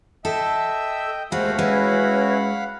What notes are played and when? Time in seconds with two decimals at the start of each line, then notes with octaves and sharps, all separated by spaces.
0.25 A4 D#5 E5 G5 E6
1.32 D#2 G#3 A3 F#4 C5 F5 F#5 B5
1.59 G#3 C#4 E4 F#4 B4